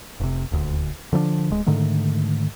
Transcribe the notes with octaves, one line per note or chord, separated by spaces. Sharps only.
F1 C3
D#1 D2
D3 F3 C4 D4
D1 G#3
G#2 D3 D#3 A3